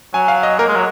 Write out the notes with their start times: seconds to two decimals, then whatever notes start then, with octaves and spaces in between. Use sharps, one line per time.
0.14 F#3 G#5
0.28 F5
0.43 D#5
0.59 A#3 A#4
0.68 G#3
0.76 F#3